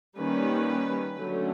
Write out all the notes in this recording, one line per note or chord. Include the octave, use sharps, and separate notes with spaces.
D#3 G3 A#3 C#4 B4
D3 F#3 A3 C#4